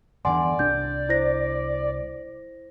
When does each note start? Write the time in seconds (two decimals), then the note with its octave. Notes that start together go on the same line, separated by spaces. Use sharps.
0.25 G1 E2 D3 D5 F#5 G#5 C6
0.59 C2 D4 G6
1.09 E4 C5 A#6